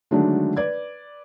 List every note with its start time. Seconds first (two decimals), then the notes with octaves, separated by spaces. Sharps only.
0.11 D3 D#3 F#3 G#3 A3 D4
0.57 B4 D5 G#6